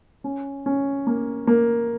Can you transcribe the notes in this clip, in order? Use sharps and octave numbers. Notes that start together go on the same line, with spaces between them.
C#4
C#4
A#3
A#3